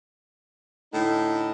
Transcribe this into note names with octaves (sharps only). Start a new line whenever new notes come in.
A2 D3 D#4